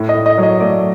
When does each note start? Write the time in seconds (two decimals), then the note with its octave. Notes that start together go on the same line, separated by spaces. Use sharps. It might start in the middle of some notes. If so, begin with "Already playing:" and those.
Already playing: A2
0.09 D#5
0.14 A2
0.26 D#5
0.38 F#3 D#5
0.60 A3 D5